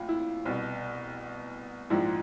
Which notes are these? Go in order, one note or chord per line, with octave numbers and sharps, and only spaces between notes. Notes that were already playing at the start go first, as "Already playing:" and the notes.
Already playing: A#1 A2 F4
E4
C2 B2
A#1 G#2 F3 E4